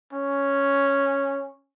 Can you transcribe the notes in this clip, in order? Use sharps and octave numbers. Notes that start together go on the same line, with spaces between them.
C#4